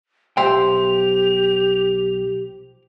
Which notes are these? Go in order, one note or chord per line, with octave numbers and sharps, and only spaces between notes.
B1 F3 G4 C5 E5 G5 F7